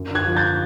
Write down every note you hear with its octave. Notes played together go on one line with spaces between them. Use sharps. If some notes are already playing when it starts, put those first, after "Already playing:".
Already playing: F#2
D3
F#6 G#6
F3
G6 A6